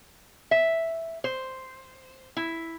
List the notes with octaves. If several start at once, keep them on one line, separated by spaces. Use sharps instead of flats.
E5
C5
E4